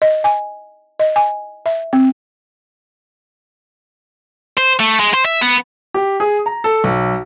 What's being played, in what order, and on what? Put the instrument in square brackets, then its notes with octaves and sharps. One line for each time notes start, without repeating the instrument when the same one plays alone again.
[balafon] D#5
G#5
D#5
G#5
E5
C4
[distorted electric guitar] C5
A3
G#3
C5
E5
B3
[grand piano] G4
G#4
A#5
A4
B1